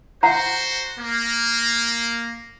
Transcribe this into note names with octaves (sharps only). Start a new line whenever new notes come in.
F#4 C5 F#5 A#5
A#3